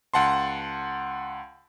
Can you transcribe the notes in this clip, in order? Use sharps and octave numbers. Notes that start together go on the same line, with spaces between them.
C#2 F#5 A5 C6